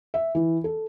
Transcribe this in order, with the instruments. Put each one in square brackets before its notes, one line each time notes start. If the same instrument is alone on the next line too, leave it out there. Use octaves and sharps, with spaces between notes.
[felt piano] E5
E3
A4